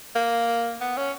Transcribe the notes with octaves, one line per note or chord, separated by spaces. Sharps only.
A#3
B3
C#4